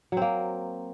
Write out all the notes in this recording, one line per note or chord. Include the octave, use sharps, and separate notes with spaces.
F#3 A#3 C4